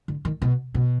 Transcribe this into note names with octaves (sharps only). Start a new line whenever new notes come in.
D3
D#3
B2
B2